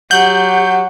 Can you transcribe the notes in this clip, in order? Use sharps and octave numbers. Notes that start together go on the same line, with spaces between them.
F#3 G4 F#5 G6